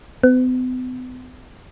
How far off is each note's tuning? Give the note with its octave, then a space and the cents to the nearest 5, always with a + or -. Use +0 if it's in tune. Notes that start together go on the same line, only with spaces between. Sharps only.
B3 +45